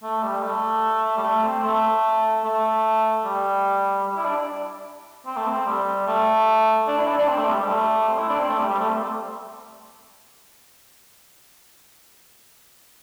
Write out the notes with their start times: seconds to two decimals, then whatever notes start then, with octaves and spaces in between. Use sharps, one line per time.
0.03 A3
0.23 G3
0.43 A3
1.17 G3
1.23 A3
1.43 C4
1.64 A3
2.44 A3
3.24 G3
4.06 G3
4.16 E4
4.25 D4
5.26 C4
5.37 A3
5.48 C4
5.66 G3
6.07 A3
6.87 D4
6.97 E4
7.07 D4
7.18 D4
7.28 C4
7.38 A3
7.48 G3
7.58 G3
7.68 A3
8.08 C4
8.18 E4
8.29 D4
8.39 C4
8.49 A3
8.58 G3
8.69 G3
8.79 A3
8.89 C4